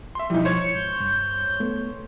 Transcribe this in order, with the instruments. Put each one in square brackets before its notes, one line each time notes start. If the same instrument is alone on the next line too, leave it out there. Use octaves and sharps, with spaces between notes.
[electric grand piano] E5 C6
[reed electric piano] B2 F3 [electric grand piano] G3 D#4 [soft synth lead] E4
[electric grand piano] C5 C#5 G#6 [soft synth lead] C#7
[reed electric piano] G#2 [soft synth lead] G6
[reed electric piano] G2
A3 B3